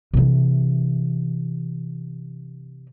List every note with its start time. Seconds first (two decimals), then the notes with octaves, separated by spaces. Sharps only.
0.14 C3 E3